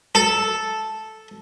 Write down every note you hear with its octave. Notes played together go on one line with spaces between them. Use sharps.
A4